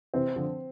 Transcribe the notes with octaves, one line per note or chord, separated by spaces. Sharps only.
C3 E3 C4
D3 F3